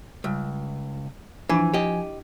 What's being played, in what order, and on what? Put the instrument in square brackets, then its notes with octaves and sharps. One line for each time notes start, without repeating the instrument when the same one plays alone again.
[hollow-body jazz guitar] C#2 [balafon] G3
[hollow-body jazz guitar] E3 [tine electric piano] F3 G#5 [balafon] D4 E4
[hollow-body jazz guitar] G4 D#5